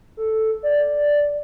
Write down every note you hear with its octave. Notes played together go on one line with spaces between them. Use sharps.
A4
D5